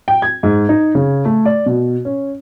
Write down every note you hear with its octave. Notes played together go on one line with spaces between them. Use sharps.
G5
G#6
G#2
D#4
C#3
A3
D5
B2
C#4